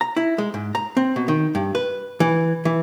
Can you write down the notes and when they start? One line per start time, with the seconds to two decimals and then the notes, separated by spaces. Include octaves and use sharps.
0.01 A#5
0.16 E4
0.38 G#3
0.54 G#2
0.75 A#5
0.97 C4
1.16 B2
1.28 D#3
1.55 G2
1.75 B4
2.20 E3
2.65 E3